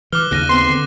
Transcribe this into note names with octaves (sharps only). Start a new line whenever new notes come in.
E3 D6 F6 F#6 G7
D#2 C#3 F#6 A#6 D#7
B3 C4 C6
D3